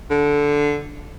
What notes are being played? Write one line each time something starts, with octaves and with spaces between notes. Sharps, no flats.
D3